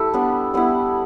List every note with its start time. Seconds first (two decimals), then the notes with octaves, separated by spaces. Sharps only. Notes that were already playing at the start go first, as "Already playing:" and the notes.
Already playing: A3 E4 G4 A4
0.14 G3 B3 D4
0.54 G3 B3 E4